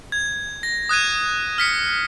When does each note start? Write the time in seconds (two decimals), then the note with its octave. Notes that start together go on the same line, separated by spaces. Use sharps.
0.12 G#6
0.63 A#6
0.89 D#6 F#6 G#6 D#7
1.58 F6 B6 C#7